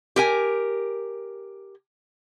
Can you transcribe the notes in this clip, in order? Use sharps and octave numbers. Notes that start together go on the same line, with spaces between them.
G4 A#4 G#5